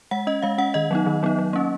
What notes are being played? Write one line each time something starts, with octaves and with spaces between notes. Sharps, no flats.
G#3 F#5
C#4 D#5
G#3 F5
C#4 F#5
D#3 D#5
F#3 B3 D#4
D#3
F#3 B3 D#4
F#3
A#3 C#4